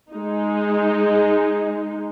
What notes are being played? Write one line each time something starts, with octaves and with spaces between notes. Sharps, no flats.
G#3 D#4